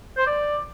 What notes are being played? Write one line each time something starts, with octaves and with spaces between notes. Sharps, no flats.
C5
D5